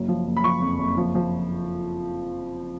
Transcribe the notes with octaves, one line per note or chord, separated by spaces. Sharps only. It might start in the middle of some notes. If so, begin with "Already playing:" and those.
Already playing: F#1 F#3
F3
F#1
B5
F3 C#6
F2
F#1
F3
F3